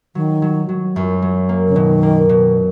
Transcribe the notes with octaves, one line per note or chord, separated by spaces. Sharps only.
D#3 F#3
F#3
F#3
F#2
F#3
A#3
C#3
B2 D#3
A#3
B2